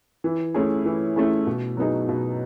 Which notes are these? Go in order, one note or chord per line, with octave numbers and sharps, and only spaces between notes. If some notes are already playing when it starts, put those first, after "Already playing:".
E3
A3 C#4 E4 G#4
E3
A3 C#4 E4 G#4
B2
F#3 B3 D#4 G#4
B2